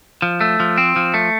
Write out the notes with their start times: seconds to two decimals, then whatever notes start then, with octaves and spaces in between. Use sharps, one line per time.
0.22 F3
0.41 A3
0.60 F3
0.78 C4
0.96 F3
1.14 A3